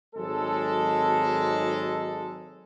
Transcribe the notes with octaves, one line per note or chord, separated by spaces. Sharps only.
G#1 F#3 G#3 D#4 A4